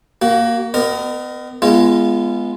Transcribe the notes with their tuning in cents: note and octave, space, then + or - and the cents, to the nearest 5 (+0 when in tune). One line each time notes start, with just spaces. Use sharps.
A#3 +0 F#4 +35
B3 +40 A#4 +0 D#5 -35
G#3 +0 B3 +0 F4 -30